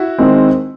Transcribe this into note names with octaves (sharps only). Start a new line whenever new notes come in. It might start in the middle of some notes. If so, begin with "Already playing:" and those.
Already playing: E4 F#4
D#3 G#3 C4